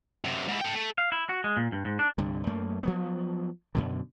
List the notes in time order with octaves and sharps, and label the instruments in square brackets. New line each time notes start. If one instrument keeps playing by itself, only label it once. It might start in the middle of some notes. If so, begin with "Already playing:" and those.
[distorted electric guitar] F#2 C3
G#2 E4
A4 G5
A3
[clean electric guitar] F5
E4
F#4
G#3
A#2
G2
G#2
D4
[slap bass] C2 G2 D3
F#2 A3 A#3
F3 F#3 B3
F#2 B2 D3